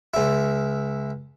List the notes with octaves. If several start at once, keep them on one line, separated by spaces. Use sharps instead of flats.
C#2 E4